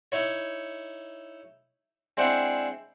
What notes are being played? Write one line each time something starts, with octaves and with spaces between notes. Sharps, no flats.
D#4 E4 C#5
G#3 C4 D4 E4 F#5 G5